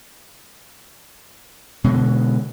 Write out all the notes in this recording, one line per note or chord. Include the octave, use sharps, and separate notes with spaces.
B2 D3 G#3